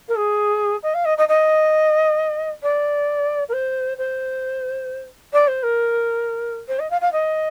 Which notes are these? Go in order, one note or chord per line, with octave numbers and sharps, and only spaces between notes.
A#4
G#4
D#5
F5
D#5
D#5
D#5
D5
A#4
C5
C5
D5
C5
A#4
C5
D#5
F5
F5
D#5